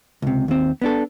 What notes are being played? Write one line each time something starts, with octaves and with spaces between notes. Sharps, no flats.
C#2 C3
D#2 C4
B3 D4 A4